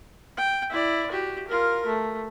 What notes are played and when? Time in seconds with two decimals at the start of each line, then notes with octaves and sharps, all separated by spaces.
0.37 G5
0.70 E4 D5
1.11 F#4 G4
1.48 F4 A#4
1.86 A3